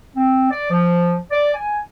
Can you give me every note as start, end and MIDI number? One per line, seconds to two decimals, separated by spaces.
0.16 0.47 60
0.51 0.66 74
0.69 1.16 53
1.31 1.52 74
1.54 1.80 80